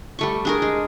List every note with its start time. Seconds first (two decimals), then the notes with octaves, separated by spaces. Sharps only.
0.19 G3 A3 C#6
0.45 D4 G#4 A#4
0.62 G#3